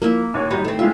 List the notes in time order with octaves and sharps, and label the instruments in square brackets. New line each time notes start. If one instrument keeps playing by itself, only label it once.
[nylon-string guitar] F3 A#4 [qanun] A#3 E4 E5
[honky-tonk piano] D#2 C#5 [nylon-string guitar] A#2
[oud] F#2 G3 D#4 [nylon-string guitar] D#3 [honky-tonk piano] B5
[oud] A3 C4
[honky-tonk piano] G#3 E4 F4 [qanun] E5 [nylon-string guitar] F5